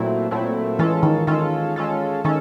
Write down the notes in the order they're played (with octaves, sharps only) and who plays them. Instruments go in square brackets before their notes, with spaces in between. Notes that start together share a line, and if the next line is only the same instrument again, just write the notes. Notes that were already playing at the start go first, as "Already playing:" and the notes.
Already playing: [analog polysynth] A#2 F#3 A3 C4 E4
A#2 F#3 A3 C4 E4
[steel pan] E3 [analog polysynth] G#3 C#4 F4 A4
[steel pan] D#3
[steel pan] D#3 [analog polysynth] G#3 C#4 F4 A4
[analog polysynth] G#3 C#4 F4 A4
[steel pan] D#3 [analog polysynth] G#3 C#4 A4